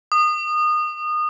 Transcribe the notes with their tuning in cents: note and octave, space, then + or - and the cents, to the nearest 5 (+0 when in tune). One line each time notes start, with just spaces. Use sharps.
D#6 -25